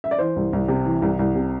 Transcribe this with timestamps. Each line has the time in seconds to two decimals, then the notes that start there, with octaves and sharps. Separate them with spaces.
0.04 E5
0.11 D5
0.18 E3 C5
0.36 C2
0.53 C2
0.68 C3
0.85 E3
1.02 C2
1.19 C2
1.35 C3